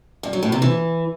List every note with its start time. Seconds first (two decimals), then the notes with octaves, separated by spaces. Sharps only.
0.23 G2
0.33 F#3
0.43 A2
0.52 C3
0.62 E3